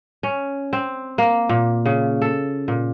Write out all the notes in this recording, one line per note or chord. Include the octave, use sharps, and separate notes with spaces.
C#4
C4
A#3
A#2
C#3
A4
A#2